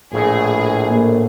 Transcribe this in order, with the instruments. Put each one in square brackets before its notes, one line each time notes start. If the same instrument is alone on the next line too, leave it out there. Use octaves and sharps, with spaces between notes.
[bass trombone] A#1 [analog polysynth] A2 [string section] G#4
[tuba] A#3